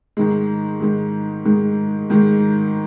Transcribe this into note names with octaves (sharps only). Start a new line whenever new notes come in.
G#2 D#3 G#3
G#2 D#3 G#3
G#2 D#3 G#3
G#2 D#3 G#3